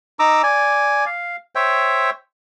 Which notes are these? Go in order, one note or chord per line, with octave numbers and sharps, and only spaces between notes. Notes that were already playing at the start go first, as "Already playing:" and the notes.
D#4 A#5 D6 E6
D5 G#5
F5
C5 C#5 E5 G5